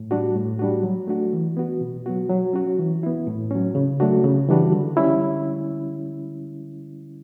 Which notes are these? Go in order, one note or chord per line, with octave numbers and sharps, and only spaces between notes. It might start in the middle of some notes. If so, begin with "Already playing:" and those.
Already playing: A2
G3 D4 F#4
A2
G3 D4 F#4
F#3
A3 D4 F#4
E3
B3 F#4
B2
F#3 B3 F#4
F#3
C#4 F#4
E3
B3 E4
A2
F#3 C#4
C#3
F#3 A3 D4 F#4
C#3
E3 G3 D4 F#4
D3
G3 C#4 E4